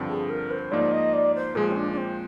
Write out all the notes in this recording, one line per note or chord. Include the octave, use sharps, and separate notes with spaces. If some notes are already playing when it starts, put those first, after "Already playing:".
Already playing: G2 D3 F3 C4
G#4
A#4
C5
G#2 F3 A#3 D#4 D5
D#5
D5
C5
A#2 F3 G#3 G#4
C4
D4
D4
C4